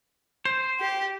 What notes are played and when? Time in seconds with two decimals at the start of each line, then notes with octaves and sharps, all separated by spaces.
0.45 C5
0.82 G4